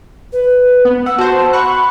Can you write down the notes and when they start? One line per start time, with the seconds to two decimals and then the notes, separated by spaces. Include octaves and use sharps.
0.33 B4
0.85 B3
1.06 F#5 E6
1.18 F#4 C5 A5
1.53 F#5 B5 C#6 F#6